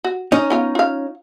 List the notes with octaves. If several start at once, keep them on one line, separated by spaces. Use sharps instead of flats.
F#4
C#4 D#4 D#5
B3 F4 F5
F4 F5